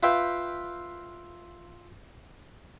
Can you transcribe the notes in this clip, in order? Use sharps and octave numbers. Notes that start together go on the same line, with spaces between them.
F4 B4 E5 F5 G5